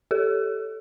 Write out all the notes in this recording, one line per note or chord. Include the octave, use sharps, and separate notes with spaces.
G4 A4